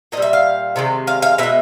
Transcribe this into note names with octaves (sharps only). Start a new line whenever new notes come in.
A#2 G3 D#5
E5
F5
C3 D#3 G#3
F5
F5
B2 G#3 E5